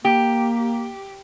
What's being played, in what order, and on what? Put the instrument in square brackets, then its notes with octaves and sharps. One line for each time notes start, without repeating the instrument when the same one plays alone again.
[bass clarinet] A#3 [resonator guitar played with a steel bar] G4